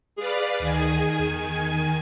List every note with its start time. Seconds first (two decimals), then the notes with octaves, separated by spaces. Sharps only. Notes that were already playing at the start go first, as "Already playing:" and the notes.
0.18 G#4 B4 D5 F5
0.60 D2 D#3 G#5
1.19 E2